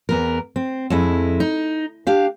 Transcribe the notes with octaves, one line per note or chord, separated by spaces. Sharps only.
E2 B3 A#4
C4
F2 G#3 E4
D#4
D4 G4 F5